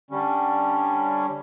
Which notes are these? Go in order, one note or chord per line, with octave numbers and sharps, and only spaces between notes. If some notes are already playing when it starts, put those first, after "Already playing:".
D3 G3 C#4